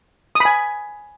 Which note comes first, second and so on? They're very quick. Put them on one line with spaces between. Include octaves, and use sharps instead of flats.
D#6 B5 G#5